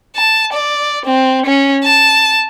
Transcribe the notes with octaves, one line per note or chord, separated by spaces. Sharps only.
A5
D5
C4
C#4
A5